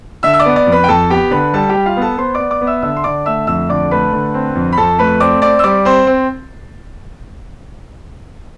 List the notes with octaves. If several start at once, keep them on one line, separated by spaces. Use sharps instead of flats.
D3 E5 E6
E6
D5 D6
B3
D5 D6
F2
B4 B5
G5
F2 A4 A5
B3 G4 G5
D3 B4 B5
G3 A4 A5
G4 G5
G3
F4 F5
B3
A4 A5
B3 C5 C6
B3 D5 D6
D5 D6
B3
E5 E6
D3 E5 E6
C6
D3 D5 D6
A3 E5 E6
F2 E5 E6
D3 D5 D6
A3 B4 B5
D3
C4
F2
B5
F2 A4 A5
A3 B4 B5
C4 D5 D6
C4 D5 D6
E6
G3 D5 D6
C4 C5 C6
C4